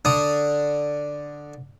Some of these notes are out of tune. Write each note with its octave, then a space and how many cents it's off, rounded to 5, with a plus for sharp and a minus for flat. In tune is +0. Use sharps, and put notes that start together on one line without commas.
D3 +0 D4 +0 D#6 +0